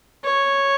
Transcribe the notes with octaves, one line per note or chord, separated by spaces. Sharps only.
C#5